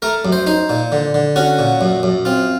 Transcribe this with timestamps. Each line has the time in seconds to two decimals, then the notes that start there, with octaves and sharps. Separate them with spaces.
0.02 A3 A#4
0.25 F#2
0.32 C5
0.46 D#4 C5
0.70 A#2
0.92 D3
1.14 D3
1.36 C#4 F#4
1.59 A#2
1.81 F#2
2.03 F#2
2.25 C4 F4